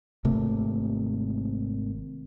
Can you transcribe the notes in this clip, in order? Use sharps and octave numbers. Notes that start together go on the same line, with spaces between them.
G#1 C3 A3 A#3